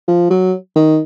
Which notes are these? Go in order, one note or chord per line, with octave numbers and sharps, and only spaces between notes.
F3
F#3
D#3